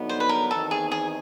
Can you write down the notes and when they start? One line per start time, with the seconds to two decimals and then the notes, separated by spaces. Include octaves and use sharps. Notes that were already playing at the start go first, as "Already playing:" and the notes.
Already playing: G2 D3 F#3 B3 D#4
0.09 C5
0.20 B4
0.29 A#4
0.51 E2 C3 D#3 A4
0.71 G#4
0.91 G#4